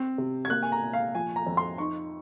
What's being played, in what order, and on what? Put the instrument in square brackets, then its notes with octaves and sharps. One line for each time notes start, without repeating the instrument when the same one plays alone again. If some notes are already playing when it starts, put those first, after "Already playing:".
Already playing: [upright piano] C4
C3
G#6
A#3 F#6
G#5
A#5
A#2
F5
F3 G#5
A#5
F2
C6
D#4 C#6